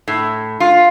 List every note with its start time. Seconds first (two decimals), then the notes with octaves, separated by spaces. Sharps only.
0.08 A2
0.60 F4